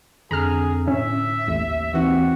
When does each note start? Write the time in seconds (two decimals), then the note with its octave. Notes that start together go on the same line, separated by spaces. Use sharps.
0.31 F2 D3 G#4 A#5 F6
0.88 A2 C#4 E5
1.47 A1 D#2
1.94 E3 C4 D#4 F#4